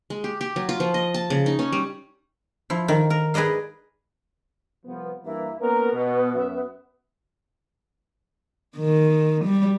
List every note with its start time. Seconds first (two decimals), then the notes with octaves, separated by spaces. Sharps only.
0.10 G#3
0.24 G4
0.41 G4
0.56 F#3
0.69 F4
0.80 F3
0.94 D#5
1.14 A5
1.30 C#3
1.46 D#4
1.59 C#4
1.72 G3
2.70 F3 E4
2.88 D#3
3.10 A#4
3.34 G#4 B4 D5 D#5 F5
4.85 C2 F3 B3
5.24 G2 E3 A#3 E4
5.60 A#3 B3 C#4 A#4
5.92 B2
6.34 F#2 C#4 E5
8.77 D#3
9.44 G3